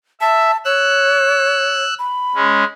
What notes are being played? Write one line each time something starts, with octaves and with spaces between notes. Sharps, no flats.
E5 A5
C#5 E6 F#6
B5
G#3 C#4